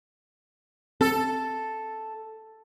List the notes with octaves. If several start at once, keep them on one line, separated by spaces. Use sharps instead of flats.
C4 A4